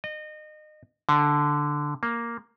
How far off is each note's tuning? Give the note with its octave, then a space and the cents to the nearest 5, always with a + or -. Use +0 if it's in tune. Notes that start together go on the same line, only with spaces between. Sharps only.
D#5 -30
D3 +0
A#3 +0